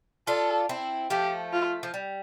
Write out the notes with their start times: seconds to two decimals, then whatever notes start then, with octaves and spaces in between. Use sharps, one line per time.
0.27 D4 F4 A4
0.69 C4 E4
1.10 F3 A3 G4
1.53 F4
1.83 F3
1.94 G3